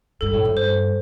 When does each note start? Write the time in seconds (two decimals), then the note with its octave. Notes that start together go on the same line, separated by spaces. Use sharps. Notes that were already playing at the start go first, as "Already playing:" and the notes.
0.21 G2 A4
0.34 A2
0.45 G2
0.57 C5